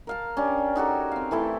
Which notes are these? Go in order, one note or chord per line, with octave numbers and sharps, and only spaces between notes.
A#4 F5 A5
C#4 D4 G4
D#4 F#4 G4 A4
C4 F5
E3 A3 E4 A4